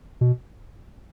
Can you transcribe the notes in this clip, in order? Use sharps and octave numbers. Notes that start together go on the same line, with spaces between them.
B2